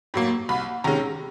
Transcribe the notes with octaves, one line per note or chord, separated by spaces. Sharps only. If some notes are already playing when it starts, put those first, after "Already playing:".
A2 F#3 A#3
C2 B5
C3 D#3 G#3 C#4 A#5